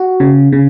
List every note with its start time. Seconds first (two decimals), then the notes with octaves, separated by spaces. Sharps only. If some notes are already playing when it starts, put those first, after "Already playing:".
Already playing: F#4
0.20 C#3
0.52 C#3